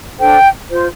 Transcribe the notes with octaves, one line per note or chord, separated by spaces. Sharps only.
D4 A4 C5 G5
F4 C5